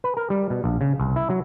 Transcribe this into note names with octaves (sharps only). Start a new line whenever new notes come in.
B4
A#4
G3
B2
A#1
C#3
C2
E4
F#3